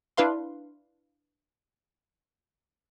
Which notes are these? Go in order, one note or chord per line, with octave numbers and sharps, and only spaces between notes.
D4 E4 B4 F5 C6